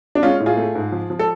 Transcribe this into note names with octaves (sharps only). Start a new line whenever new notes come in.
D4
G#3 C#4 F4
A2
F4 G#4
A3
G#2
F3
F3
A4